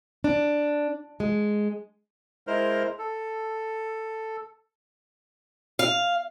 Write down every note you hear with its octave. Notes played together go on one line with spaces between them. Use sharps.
D4
G#3
G#3 E4 A#4 C5 F6
A4
F5